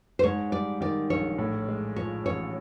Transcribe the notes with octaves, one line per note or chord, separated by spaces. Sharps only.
C5
G#2 C#5
G3 D5
D#3 D5
A#1 C#5
A2
G#3
F3 C#5
A1 C#5